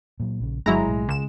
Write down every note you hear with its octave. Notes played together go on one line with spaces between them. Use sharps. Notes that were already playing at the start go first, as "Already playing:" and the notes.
A#2 F#3
A#1 C#3
G1 F#3 G#3 E4 A#5
B1 A2
C#2 C#3 E7